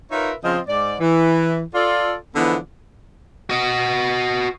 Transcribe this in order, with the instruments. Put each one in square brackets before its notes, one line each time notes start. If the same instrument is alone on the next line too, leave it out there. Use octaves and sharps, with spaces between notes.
[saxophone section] D#4 F4 A#4 B4 C#5 E5
C#3 F3 C4 F4 D#5
G#2 D5
E3
F4 A4 D5
D3 E3 F3 G#3 B3
[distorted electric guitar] F#4 D#5